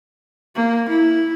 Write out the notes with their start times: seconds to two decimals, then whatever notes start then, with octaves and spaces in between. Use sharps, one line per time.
0.55 A#3
0.89 E4